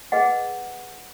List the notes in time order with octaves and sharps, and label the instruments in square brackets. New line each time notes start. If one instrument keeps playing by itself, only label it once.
[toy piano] G#4 B4 D#5 F#5